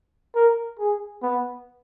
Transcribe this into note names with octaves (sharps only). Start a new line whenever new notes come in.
A#4
G#4
B3